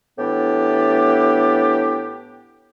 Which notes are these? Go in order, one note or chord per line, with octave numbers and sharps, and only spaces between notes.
A2 E3 B3 D4 G4